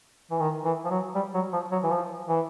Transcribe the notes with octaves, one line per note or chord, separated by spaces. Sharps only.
E3
D#3
E3
F3
F#3
G3
F#3
F3
F#3
E3
F3
E3